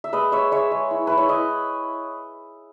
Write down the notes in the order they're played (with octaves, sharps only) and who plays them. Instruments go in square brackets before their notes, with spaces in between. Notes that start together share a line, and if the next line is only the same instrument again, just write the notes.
[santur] E5
G#3 B4 D#5
G#3 C#5 E5
G#3 C#5 E5
G#3
E4
E4 B4
C#5
E4 B4 D#5